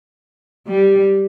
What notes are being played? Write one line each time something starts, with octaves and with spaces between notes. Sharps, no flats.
G3